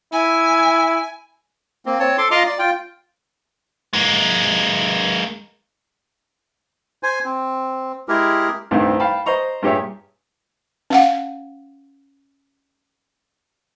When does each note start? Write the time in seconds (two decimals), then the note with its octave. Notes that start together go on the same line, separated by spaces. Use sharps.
0.13 E4 G#5
1.86 A#3 C4
2.00 C4 C#5 A5
2.18 A4 C6 D6
2.31 F4 D#5 A#5 C6 D6
2.46 D5
2.59 F4 G5
3.93 G#3 A#3
7.03 C5 G#5
7.25 C4
8.08 G#3 E4 G4 G#4 A#4
8.71 C2 G2 D#3 A3 C4
9.00 F5 G5 A5 B5
9.26 C5 D#5 A#5 C#6
9.63 G2 A#2 G4 G#4 C#5 E5
10.90 C#4 F5 F#5